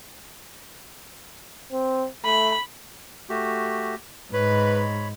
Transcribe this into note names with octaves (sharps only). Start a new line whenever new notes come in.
C4
A3 B5
A3 F#4 G4
G#2 B4 C#5 B5